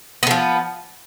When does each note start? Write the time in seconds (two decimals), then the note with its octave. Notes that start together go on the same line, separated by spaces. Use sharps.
0.23 B3
0.27 D3
0.31 F3